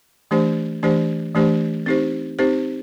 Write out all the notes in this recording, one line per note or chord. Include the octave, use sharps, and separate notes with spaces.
E3 A3 D4 G4 C5
E3 A3 D4 G4 C5
E3 A3 D4 G4 C5
C4 D#4 G4 C5
C4 D#4 G4 C5